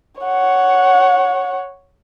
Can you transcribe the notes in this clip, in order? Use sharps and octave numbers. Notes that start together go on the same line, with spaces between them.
C#5 F#5